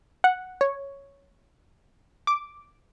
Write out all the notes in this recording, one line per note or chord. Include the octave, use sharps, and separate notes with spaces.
F#5
C#5
D6